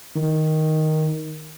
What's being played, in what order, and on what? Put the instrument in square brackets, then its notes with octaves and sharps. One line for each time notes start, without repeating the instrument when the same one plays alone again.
[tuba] D#3